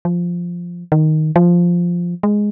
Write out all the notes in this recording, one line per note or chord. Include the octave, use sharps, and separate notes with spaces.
F3
D#3
F3
G#3